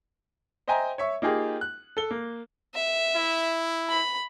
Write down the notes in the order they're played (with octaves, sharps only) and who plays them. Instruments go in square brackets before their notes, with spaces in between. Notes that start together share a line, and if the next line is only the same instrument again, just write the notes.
[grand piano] C5 D#5 E5 G5 G#5 A#5
C#5 E5 C#6
A#3 D#4 F4 G4 G#4
F#6
A4 G7
A#3
[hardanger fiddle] E5
[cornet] E4
[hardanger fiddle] B5